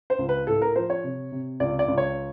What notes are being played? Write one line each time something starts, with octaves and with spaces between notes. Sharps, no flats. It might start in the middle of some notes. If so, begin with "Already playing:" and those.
C5
C#2
B4
A2 A4
A#4
F3 C5
C#5
C3
C3
C#2 D5
D5
C#2
C#5